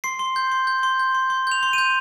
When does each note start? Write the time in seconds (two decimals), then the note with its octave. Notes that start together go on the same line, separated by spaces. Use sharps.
0.04 C6 C7
0.19 C6
0.36 G6
0.52 C6
0.67 G6
0.83 C6
0.99 G6
1.15 C6
1.30 C6
1.47 G6 F7
1.63 C6
1.73 G6 D#7